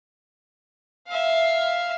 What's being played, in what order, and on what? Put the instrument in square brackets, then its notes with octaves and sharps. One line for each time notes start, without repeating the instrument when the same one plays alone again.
[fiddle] E5 F5